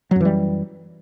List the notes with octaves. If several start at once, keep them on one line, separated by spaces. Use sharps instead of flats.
F#2 E3 F#3 G3